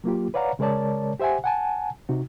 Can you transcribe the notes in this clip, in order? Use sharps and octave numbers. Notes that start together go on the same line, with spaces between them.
F#3 A#3 F4 G4
B4 C#5 D5 F5 F#5 A#5
C#3 G#3 A#4 C#5 D5 A5
G4 C5 E5 F#5 G#5
F#5 G#5 A5
C3 D#4 F#4